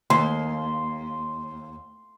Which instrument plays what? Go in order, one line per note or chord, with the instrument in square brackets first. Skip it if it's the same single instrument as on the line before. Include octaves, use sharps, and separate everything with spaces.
[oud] D#2 [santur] C6